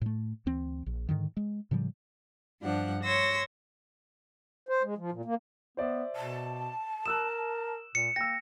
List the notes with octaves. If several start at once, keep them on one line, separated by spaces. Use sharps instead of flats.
A2 A3
D2 E3 C4
A#1
G#2 B2 D3 D#3
G#3
A2 C#3 F3 G3
G2 F3 D4 F#5
C#5 C6 E6 A#6
C5
G#3
F3
A#2
A#3
B3 C5 D5 E5
B2 A5
A#4 D#6 E6 F#6 E7
A#2 C#7
A#3 G5 E6 A#6